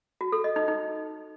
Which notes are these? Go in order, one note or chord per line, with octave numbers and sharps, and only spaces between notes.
F#4
A4
D#5
D#4
D#4